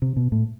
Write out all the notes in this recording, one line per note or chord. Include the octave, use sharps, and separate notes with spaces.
C3
B2
A2